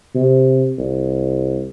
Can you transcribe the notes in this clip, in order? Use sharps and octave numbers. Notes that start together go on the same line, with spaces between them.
C3
C2